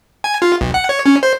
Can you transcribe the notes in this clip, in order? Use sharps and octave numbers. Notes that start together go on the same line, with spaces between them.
G#5
F4
B1
F#5
C#5
C#4
C5